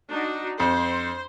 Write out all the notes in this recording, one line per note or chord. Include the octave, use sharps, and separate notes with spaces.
D4 D#4 F#4
F2 C5